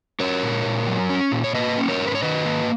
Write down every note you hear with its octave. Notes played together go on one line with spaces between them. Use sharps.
C#4 A#4 C#5
A#2
A#2
F#3
C#4
A#2
C#5
A#3 B4 D#5
C#4
A#4 C#5
G#2
B4
C#5
D#3 B4 D#5
A#3